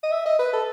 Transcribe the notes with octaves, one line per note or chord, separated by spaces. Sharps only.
D#5
E5
D#5
B4
A4